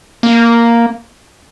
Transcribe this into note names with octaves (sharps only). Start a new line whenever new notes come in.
A#3